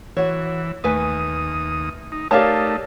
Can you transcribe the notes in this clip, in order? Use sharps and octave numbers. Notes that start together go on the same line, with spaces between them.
E3 F#4 C#5
D#2 A3 B4 G#5 D#6
D#4
A3 D#4 G4 A#4 C#5 D5 F5 A5